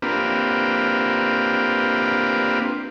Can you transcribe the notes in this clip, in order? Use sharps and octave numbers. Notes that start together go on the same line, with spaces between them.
A#3 C4 D4 F4 G4 B4